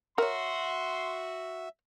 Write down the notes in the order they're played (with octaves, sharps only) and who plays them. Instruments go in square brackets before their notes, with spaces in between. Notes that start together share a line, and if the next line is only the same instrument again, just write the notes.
[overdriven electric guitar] F#4 [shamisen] A#4 C#5 [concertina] E5 [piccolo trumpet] C6